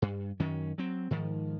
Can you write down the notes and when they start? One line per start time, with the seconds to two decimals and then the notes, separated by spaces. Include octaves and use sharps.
0.02 G2
0.40 F#2 D#3 C#4
0.78 F#3 C4
1.11 G#2 D#3 F3